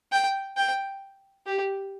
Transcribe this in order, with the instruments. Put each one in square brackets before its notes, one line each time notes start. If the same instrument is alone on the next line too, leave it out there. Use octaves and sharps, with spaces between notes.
[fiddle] G5
G5
G4